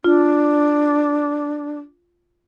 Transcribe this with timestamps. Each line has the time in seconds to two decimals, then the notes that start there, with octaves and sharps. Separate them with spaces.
0.04 D4 F4